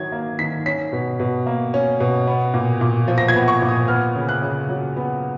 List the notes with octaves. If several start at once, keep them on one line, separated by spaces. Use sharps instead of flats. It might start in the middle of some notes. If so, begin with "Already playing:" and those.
Already playing: D#3 F#3 G#6
A#3
D#3 B6
C#4 B6
B2
B2
A#3
C#4
B2
B3
A#2
A#2
F3
A#6
G#6
B3
C#6
A#2
D#6
B3 F6
C#3
F#6
C#3
F#3
B3